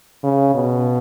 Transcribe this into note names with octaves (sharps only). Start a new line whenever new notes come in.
C#3
B2